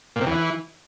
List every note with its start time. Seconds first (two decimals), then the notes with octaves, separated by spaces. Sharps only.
0.16 A#2
0.21 C3
0.26 E2
0.31 E3